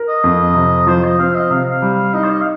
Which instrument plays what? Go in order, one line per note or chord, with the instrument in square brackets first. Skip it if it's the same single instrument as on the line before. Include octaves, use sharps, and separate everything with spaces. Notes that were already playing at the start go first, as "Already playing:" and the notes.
Already playing: [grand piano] A#4
[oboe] D#5
[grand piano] F2
C3
[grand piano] F3 [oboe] C5
[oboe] D#5
[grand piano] C4 [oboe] F5
[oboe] D#5
[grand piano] C3 [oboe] F5
[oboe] F5
[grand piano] G3
[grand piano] D#4 [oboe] D#5
[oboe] C5
D#5
F5